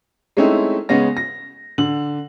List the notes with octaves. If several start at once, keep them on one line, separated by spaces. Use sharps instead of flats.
G#3 A3 C4 C#4 D#4 E4
C#3 G#3 B3 C#4 A#6
A#6
D3 F#7